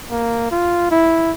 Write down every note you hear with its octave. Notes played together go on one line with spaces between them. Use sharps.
A#3
F4
E4